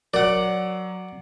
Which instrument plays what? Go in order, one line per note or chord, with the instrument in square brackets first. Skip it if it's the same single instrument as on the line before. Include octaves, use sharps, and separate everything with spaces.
[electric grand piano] F#3 [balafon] A#4 [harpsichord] D5 F#5